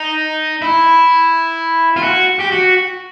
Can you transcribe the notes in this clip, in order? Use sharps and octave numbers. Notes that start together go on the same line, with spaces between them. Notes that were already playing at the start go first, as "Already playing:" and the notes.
Already playing: D#4
E4
F4
F#4
G4
F#4